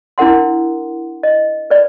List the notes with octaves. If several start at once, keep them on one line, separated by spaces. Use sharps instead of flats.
D4 E4 A#4 F#5 C6
D#5
B4 D5